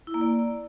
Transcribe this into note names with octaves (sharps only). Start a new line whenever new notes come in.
E4
A#3
D5